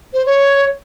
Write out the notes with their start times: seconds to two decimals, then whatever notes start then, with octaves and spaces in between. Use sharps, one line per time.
0.13 C5
0.26 C#5